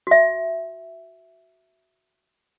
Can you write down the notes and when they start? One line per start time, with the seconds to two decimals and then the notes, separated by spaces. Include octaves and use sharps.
0.07 F#4 E5